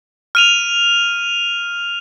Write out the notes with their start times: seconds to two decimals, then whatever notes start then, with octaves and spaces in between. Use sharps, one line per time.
0.35 F6 D#7 F7